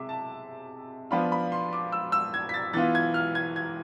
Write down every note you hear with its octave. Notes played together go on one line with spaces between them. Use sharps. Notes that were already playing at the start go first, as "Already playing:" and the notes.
Already playing: C3 G#3 E5 D6
A5
F3 B3 D4 F4 B5
B5
C6
D6
E6
E6
G#6
B6
A6
E3 B3 F4 A6
G#6
F6
G#6
G#6